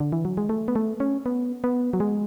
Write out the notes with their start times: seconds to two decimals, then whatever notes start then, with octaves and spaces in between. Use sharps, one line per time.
0.00 D3
0.12 E3
0.25 F#3
0.37 G#3
0.49 A3
0.68 B3
0.76 A3
1.00 C#4
1.26 B3
1.64 B3
1.93 F#3
2.00 G#3